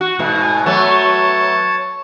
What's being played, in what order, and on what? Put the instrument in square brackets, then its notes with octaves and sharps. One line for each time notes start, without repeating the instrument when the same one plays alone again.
[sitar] F#4
G#2 B2
[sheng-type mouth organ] G#5
[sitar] F#3 A3 B3 [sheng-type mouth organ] C#5 A5